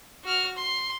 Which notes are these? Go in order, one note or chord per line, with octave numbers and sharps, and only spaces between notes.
F#4 F6
C6